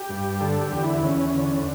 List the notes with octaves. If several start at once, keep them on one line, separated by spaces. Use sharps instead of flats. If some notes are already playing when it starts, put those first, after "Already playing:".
Already playing: G4
G2
D3 A4
G4
E2
E4
E2 C#4
D3